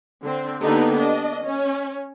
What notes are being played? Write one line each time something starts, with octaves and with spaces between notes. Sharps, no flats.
D3 C4
D3 A#3 B3 D#4 G4 A4
D4 D#5
C#4